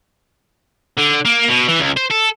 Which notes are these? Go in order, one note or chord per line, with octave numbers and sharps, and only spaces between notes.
D3
A#3
B2
E3
C#2
C5
A4